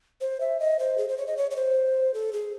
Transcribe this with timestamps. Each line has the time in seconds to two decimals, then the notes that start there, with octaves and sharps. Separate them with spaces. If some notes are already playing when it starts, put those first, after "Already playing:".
0.21 C5
0.41 E5
0.60 D#5
0.79 C5
0.98 G#4
1.09 C5
1.18 C#5
1.27 D#5
1.37 C#5
1.51 C#5
1.56 C5
2.14 A4
2.33 G#4